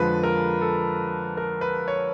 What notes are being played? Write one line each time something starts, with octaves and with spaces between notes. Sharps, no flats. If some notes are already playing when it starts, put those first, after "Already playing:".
Already playing: F2 D3 F3 G#3 B4
A#4
A4
A#4
B4
C#5